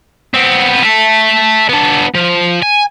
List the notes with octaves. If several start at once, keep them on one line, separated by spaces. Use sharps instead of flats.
B3 C4
E5 A5
B3 D4
F3
G#5